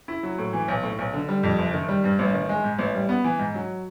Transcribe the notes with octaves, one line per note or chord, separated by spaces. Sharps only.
E4
F#3
A2
E3
B1
A2
B1
D3
G3
F2
F#1
D#3
G3
G2
A1
D#3
G#3
G#2
A1
G3
B3
E3
G#2
F#3